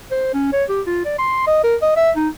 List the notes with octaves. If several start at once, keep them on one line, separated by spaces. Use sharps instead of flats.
C5
C#4
C#5
G4
F4
D5
C6
D#5
A#4
D#5
E5
D#4